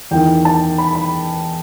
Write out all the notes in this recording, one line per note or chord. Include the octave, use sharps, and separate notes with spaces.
E2 D#3 G5
A5
B5
B5